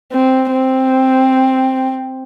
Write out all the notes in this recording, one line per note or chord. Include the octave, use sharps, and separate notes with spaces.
C4
C4